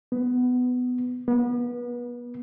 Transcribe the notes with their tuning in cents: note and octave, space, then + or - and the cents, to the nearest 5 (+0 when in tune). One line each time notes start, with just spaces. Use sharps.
B3 +15
B3 -30